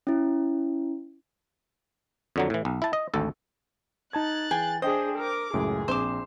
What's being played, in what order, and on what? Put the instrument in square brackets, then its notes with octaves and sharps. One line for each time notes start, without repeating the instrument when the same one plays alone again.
[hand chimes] C#4 E4
[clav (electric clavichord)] F2 D3 F#3
A2 E3
B1
E4 A5
D#5
G#1 D2 A4
[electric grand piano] D#4 A5 G#6 [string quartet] F#6 A6
[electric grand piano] E3 [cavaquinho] G#4 G5
[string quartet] D4 G#4 [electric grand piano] C5 G5 [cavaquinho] D#5
[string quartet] A#4 D6
[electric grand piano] C#2 F#2 A2 [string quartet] G#4
[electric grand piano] A#1 C4 E7 [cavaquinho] C5 D6